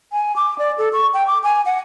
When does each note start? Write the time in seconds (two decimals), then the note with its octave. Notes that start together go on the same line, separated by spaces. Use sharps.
0.12 G#5
0.36 D6
0.59 D5
0.78 A4
0.93 C#6
1.14 G5
1.27 D6
1.44 G#5
1.66 F#5